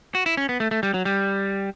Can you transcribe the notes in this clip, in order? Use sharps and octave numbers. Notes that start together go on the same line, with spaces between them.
F#4
E4
C#4
B3
A3
A3
G3
F#3
G3